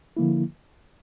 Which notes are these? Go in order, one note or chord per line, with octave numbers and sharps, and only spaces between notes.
D3 F3 A#3 E4